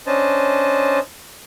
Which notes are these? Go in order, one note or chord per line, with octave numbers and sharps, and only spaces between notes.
C#4 D4 C5 D#5 A5